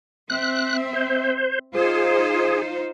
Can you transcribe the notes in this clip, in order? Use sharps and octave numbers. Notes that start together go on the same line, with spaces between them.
C4 E5 F#6
C5
D#4 F4 G#4 C5